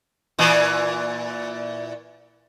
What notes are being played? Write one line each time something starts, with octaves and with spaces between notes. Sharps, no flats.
A#2 E3